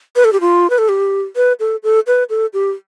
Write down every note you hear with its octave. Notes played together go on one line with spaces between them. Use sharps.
B4
A4
G4
F4
B4
A4
G4
B4
A4
A4
B4
A4
G4